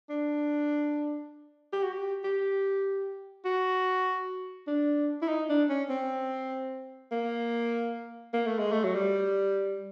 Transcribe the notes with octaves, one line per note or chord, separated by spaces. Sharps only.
D4
G4
F#4
G4
G4
F#4
D4
E4
D#4
D4
C#4
C4
A#3
A#3
A3
G#3
A3
F#3
G3